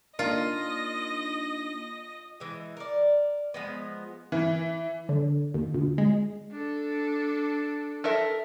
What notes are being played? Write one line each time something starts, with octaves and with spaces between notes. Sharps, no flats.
A#3 D4 D#4 F4 D#5
E3 G#3
A#4 D5
F3 G#3 B3
E3
D3
D#2
D2
G#3
D4 A4
A4 A#4 E5